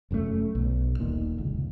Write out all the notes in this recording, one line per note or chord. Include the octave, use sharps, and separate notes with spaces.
F1 F#2 C3 A3
B1
D#1 A#2 D#3
F1 C#2